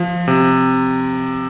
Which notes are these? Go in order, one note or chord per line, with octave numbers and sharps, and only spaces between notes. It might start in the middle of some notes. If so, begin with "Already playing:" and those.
Already playing: F3
C3